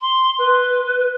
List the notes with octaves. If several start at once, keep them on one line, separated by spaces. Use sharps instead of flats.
C6
B4